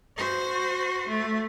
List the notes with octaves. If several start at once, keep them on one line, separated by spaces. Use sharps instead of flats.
F#4 C5
A3